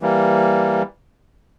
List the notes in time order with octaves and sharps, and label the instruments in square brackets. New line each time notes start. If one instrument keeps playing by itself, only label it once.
[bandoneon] E3 G3 A#3